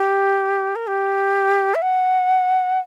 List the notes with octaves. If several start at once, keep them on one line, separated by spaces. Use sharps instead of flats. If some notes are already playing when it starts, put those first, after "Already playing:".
Already playing: G4
A#4
G4
E5
F#5